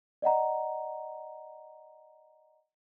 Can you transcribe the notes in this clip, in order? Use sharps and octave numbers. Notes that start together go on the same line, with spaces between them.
D5 D#5 F#5 A#5